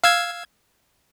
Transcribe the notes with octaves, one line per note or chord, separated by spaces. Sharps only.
F5 E6 G#6